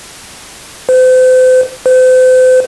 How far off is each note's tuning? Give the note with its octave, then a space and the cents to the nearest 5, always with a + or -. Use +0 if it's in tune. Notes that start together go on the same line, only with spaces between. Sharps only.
C5 -40
C5 -40